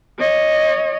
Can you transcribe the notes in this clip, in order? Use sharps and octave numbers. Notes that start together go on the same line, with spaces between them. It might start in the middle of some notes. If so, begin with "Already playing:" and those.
C#5 D#5